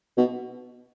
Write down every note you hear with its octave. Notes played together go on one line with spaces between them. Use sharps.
B2